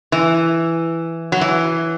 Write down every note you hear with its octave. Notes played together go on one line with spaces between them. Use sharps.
E3
F#3
E3